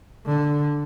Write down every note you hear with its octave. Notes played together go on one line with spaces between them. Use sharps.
D3